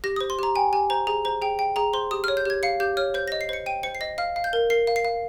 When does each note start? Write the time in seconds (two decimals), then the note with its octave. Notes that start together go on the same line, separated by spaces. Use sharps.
0.04 G4 A#6
0.16 C5 D#6
0.30 C6
0.39 G4 A#5
0.55 G5 G#5
0.73 G4 G#5
0.90 C5 A#5
1.07 G#4 A#5
1.25 C5 A#5
1.42 G#4 G5
1.59 G5
1.76 G#4 A#5
1.93 C5 C6
2.11 G4 D#6
2.24 C#5 F6
2.37 G6
2.45 G4 G#6
2.63 F5 C#7
2.80 G4 G6
2.97 C#5 F6
3.14 C5 G6
3.28 D#5 A#6
3.41 C7
3.49 C5 C#7
3.66 G5 D#7
3.83 C5 C#7
3.95 C7
4.01 D#5 A#6
4.18 F5 F6
4.36 F5
4.44 G6
4.53 A#4
4.70 A#4 C7
4.87 F5
4.96 C7
5.05 F5